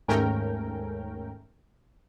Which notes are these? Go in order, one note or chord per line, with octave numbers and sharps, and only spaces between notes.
D#2 G#2 A3 C#4 A#4 G5